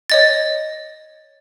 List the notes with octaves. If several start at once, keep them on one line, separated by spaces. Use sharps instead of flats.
C#5 D#5 A6